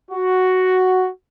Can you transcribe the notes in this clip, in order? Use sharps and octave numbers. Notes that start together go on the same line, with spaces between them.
F#4